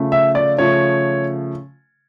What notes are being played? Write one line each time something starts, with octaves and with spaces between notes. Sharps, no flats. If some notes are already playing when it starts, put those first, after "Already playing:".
Already playing: C#3 F3 A3
E5
D5
C#3 F3 A3 C#5